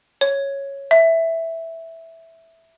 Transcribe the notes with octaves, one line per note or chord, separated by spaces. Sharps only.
C#5
E5